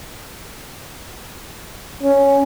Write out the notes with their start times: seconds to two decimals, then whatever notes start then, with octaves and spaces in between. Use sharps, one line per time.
2.03 C#4